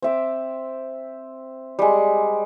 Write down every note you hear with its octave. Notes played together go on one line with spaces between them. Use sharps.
C4 E5 D6
G3 G#3